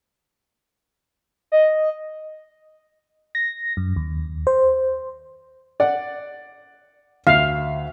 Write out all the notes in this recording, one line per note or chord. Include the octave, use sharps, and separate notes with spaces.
D#5
A#6
F#2
D#2
C5
D5 F#5
D2 E5 F5